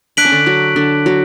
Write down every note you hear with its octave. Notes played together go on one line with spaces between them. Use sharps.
D4 F#6 B6 D7 F#7
C#4
D3 D4
F#3 F#4
D3 D4
F#3 F#4